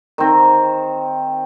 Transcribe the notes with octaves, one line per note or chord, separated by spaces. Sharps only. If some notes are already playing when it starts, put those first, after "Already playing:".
D#3 C4